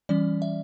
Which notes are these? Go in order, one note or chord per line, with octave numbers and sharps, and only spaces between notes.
E3 G3 C#4 D5
E5